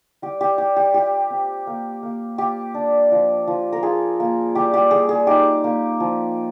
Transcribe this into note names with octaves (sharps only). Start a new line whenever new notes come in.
G3 G4
G4
G3 G4
G4
F4 G4
C4
A#3
A#3
F4 G4
D4
F3
F3
A#4
F4 G#4
A#3
G3 G4
G4
G3 G#4
G#4
D#4 G4
A#3
F3